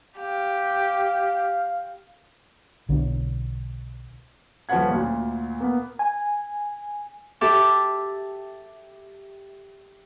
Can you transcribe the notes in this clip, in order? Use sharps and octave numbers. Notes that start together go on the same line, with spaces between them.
G4 F5
B1 D3
D#1 F3 C#4 B4 F#5 G#6
D2 A#2
A#3 B3
G#5
G4 A4 E5 D6 E6